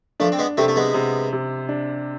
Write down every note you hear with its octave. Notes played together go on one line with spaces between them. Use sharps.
F3 A3 D4
C4
G#3 B3
C3 A3 C4
A3
G#3 B3
C3
C3
D4